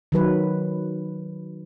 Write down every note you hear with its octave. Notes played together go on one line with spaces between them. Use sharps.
D#3 F#3 B4